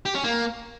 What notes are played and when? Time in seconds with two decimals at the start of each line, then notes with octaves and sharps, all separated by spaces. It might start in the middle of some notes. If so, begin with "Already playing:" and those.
0.06 G4
0.15 C#4
0.24 A#3